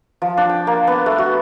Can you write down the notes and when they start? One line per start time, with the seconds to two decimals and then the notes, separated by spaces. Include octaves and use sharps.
0.22 F3
0.37 D4
0.49 G5
0.67 A#3
0.87 B3
1.06 A3
1.18 F#4